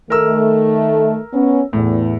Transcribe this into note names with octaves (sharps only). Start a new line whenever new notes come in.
D#3 A3 A#4 E6
B3 C#4
E2 A2